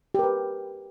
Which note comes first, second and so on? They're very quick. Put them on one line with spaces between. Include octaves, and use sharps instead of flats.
G4 A#4 B4